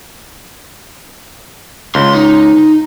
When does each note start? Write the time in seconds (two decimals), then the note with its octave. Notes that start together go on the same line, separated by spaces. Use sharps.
1.95 C#2 C6
2.14 D#4